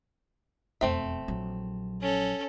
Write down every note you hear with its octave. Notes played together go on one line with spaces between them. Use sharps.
E1 F2 A3 C4 E5
A#1 F#3
C#4 A4